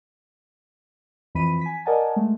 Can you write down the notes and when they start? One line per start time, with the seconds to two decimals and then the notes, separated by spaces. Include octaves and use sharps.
1.35 F2 E3 B5 B6 D#7
1.61 G#5 B6
1.86 A#4 D5 D#5 F#5 G#5 A5
2.16 G#3 A3